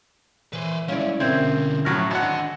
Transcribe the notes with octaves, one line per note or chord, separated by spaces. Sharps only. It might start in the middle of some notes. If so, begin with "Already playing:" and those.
E3 B4 C5
G#3 A3 C#4 E4 D5 F5
B2 D3 C4 A#4 G6 G#6
A2 F#3 F6 A#6
G#1 D3 F#5 A5